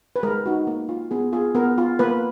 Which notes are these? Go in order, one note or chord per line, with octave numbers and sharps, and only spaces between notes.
B4
G#3 A#4
D#4 F#4
A#3
F4
B3 G#4
F4 G#4
B3 A#4
F4
A#3 B4